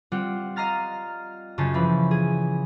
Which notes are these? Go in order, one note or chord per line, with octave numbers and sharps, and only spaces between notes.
G3 C4 F4 F#5
D#5 F5 A#5 F6 A6
F#2 C#3 C#4 F4 A5 G6
E3 F3 C#4 B5
G#4